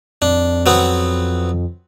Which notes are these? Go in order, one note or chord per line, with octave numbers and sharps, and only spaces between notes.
F2 D4
F#3 B3 C4